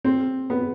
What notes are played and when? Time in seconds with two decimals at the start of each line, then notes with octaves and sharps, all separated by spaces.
0.05 C4
0.50 B3